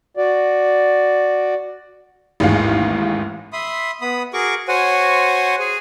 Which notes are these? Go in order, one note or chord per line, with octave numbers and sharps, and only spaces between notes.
F#4 D5
A1 D#2 G#2 G#4 F5
E5 B5 C6 D#6
B3 B5 D#6
F#4 G#4 A#4 C#6 D6
F#4 C5 C#5 F#5 G#5
G#4 G#5